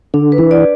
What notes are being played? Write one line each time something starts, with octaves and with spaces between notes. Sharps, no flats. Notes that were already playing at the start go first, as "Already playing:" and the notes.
D3 D4
B4
E3
D5